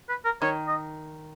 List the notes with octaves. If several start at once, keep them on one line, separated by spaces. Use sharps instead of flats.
B4
A#4
D#3 C#5
D#5